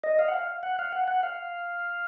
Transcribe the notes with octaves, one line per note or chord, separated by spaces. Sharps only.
D#5
F5
F#5
F5
F#5
F5
F#5
F#5
F5